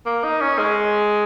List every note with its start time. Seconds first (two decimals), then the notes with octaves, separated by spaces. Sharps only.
0.06 A#3
0.24 D#4
0.41 C#4
0.59 G#3